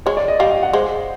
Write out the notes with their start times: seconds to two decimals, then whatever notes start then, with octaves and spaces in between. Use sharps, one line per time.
0.06 G#3 C#5
0.17 D5
0.28 D#5
0.40 G3 F5
0.51 F5
0.63 F#5
0.73 G#3 C5